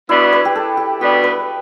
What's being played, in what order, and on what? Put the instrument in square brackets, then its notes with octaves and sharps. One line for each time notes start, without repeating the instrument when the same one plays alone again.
[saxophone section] B2 G3 B3 D4 [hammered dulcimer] E4
[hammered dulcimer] B4
G4
A4
G4
[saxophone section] B2 G3 B3 D4 [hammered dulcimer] G4
[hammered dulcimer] B4